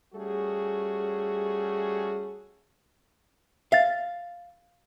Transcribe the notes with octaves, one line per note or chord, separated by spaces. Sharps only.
G3 A3 C#4 F#4 G#4
E5 F5 A6